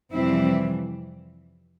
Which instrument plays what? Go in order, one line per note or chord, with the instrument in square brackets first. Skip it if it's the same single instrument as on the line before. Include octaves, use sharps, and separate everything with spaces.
[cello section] F2 C3 E3 G3 C4 E4